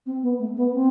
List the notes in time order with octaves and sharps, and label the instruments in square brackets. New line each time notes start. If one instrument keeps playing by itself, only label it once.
[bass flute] C4
B3
A3
B3
C4